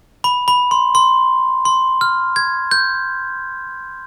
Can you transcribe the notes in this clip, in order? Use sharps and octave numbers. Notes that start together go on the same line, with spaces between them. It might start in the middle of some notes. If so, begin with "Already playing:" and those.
B5
B5
C6
C6
C6
F6
G#6
G6